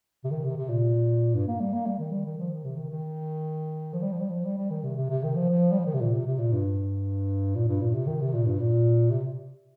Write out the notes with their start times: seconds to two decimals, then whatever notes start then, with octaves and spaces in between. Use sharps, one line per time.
0.24 C3
0.31 D#3
0.44 C3
0.57 C3
0.69 A#2
1.35 G2
1.48 A#3
1.60 G3
1.74 A#3
1.86 G3
1.99 D#3
2.11 G3
2.26 D#3
2.38 F3
2.50 D#3
2.64 C3
2.77 D#3
2.90 D#3
3.93 F3
4.02 G3
4.12 F3
4.20 G3
4.29 F3
4.45 G3
4.58 G3
4.70 D#3
4.83 C3
4.96 C3
5.10 C3
5.23 D#3
5.35 F3
5.49 F3
5.71 G3
5.79 F3
5.86 D#3
5.94 C3
6.01 A#2
6.14 C3
6.26 C3
6.39 A#2
6.53 G2
7.55 A#2
7.68 G2
7.81 A#2
7.94 C3
8.07 D#3
8.21 C3
8.34 A#2
8.46 G2
8.60 A#2
9.11 C3